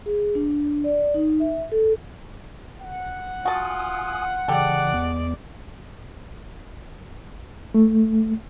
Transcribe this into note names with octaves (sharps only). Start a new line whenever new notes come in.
G#4
D4
D5
D#4
E5
A4
F#5
F4 F#4 G#5 A5 D#6
C#3 E3 G#3 G4 A4 D5
E2 B3
A3